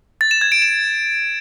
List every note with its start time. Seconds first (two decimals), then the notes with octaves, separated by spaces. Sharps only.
0.21 A6
0.31 E7
0.41 G#6
0.52 D7
0.62 E7